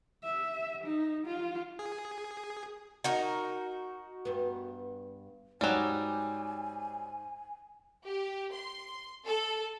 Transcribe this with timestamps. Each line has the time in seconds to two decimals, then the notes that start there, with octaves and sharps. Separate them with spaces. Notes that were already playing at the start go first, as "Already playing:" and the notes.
0.24 E5
0.84 D#4
1.26 F4
1.79 G#4
3.04 D#4 F#4 A#4
4.25 G2 B3
5.61 G#2 F#3 G3 G5 G#5 E7
8.04 G4
8.53 C6
9.25 A4